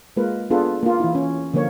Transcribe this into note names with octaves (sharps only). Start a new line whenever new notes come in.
G#3 A#3 F4 A#4 B4
B3 D4 F4 G#4 A4 B4
A#3 F4
E3 E4
C#4
D3 F3 A#3 A#4 C#5